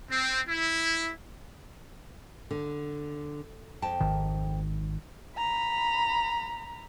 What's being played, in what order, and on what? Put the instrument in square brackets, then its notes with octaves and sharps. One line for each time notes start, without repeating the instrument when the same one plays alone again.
[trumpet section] C4
E4
[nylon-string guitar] D3
F2 G5 A5
[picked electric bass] G#1 G#2 D#3
[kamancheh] A#5 B5